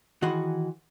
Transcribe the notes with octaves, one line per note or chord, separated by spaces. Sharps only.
D#3 E3 F#4 G#4 F#5 C6